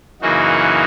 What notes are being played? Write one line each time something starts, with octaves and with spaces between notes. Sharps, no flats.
F#2 C#3 E3 A#3 D#4 F#4